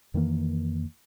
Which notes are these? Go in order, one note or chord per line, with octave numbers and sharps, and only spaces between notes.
F2 D#3 E3 A#3